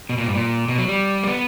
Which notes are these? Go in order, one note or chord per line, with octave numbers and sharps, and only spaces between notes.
B2
A#2
G2
A#2
B2
F#3
G3
A#3
B3